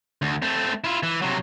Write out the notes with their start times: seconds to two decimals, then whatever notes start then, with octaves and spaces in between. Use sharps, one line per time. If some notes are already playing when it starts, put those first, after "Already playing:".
0.22 D2
0.42 A3 C4
0.84 E4 F4
1.03 E3
1.22 C3 F#3